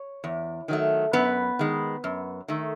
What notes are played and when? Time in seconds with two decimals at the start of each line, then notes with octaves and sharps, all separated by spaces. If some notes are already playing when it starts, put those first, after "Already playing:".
Already playing: C#5
0.24 E2
0.68 D#3 F#3 A3
1.13 F#2 B3 B4
1.59 D#3 G#3
2.04 F#2
2.48 D#3 A3